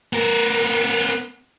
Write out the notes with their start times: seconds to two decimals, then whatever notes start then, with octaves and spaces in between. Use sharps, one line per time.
0.13 B3 A#4